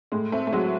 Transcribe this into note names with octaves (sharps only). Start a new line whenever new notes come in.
A2 G#3
A3 C4
A3
F#3 G#3